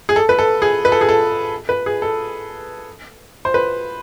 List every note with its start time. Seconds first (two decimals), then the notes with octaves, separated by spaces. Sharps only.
0.09 G#4
0.16 A4
0.29 B4
0.39 A4
0.62 G#4
0.85 B4
0.92 A4
1.01 G#4
1.09 A4
1.69 B4
1.86 G#4
2.02 A4
3.45 C5
3.54 B4